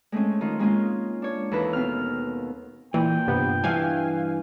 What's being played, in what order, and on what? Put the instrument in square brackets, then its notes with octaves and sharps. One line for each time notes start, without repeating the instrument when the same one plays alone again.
[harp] G#3 A3 C4 C#4
D#3 F4
G#3 A#3 C#4 F4
D4 C#5
D#2 E3 A4 B4
B2 C4 F6
[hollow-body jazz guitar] A#2 [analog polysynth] E3 [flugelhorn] G5
[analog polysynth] G2 C3 B3
[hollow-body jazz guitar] G2 E3 [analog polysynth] F5 G#5